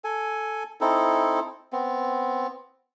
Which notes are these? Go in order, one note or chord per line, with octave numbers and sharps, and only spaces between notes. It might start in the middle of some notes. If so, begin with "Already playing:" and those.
A4 G#5
C4 D#4 E4 A4
B3 C4